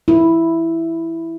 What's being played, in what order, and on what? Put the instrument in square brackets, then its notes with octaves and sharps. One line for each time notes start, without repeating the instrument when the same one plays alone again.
[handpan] E4